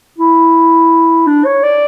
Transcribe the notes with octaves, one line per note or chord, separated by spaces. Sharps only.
E4
D4
C#5
D5